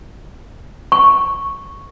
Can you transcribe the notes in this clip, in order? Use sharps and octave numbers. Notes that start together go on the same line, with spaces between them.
C#6